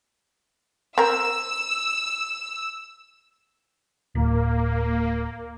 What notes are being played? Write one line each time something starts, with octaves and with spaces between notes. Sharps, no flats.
C4 A#4 E6
D1 A#3